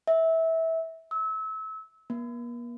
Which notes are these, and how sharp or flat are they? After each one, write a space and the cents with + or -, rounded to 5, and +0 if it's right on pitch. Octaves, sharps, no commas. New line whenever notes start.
E5 -20
E6 -30
A#3 +45